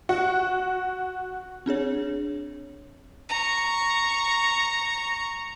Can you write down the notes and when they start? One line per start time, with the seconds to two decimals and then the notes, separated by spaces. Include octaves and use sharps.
0.09 F#4
1.66 C4 D4 G#4 C#5
3.29 A#5 C#6